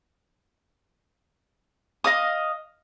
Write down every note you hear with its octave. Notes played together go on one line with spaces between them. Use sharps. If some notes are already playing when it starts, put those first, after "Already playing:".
D#5 F5 D#6